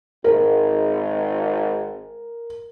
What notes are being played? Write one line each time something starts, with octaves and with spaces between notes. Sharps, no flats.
G#1 A#4